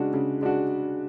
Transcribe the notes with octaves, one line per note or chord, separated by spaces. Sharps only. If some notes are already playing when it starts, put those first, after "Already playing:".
Already playing: C#3 G#3 D4 F#4
C#3
G#3 D4 F#4